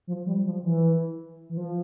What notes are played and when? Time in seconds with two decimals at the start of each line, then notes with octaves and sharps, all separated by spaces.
0.07 F3
0.26 G3
0.45 F3
0.63 E3
1.49 E3
1.57 F3